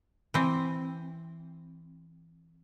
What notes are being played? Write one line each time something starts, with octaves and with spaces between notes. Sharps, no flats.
E3 C4